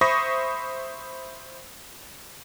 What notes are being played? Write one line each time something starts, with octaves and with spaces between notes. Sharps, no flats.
C5 E5 B5 C#6 D#6 A#6